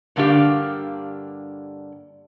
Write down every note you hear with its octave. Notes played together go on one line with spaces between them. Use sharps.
G2 D3 A#3 D4 G4 F5